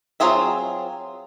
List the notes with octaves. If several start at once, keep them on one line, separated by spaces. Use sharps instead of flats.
F#3 C4 F4 G#4 E5